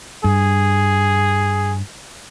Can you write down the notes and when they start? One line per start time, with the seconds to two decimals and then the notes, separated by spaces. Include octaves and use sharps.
0.24 G2 G#4